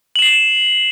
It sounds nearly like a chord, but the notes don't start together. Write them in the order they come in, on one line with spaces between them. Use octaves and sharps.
F#7 E7 C7